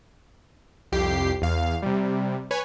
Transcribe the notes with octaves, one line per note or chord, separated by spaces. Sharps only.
C2 F2 G4 C7
E2 F5
C3 G3
B4 C#5 G#5